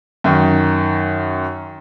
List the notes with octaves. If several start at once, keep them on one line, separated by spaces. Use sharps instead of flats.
F#2 D#3